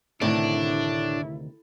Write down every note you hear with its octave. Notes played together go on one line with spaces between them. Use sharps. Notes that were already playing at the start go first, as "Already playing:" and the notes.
D2 A2 C3 D#3 D4 E4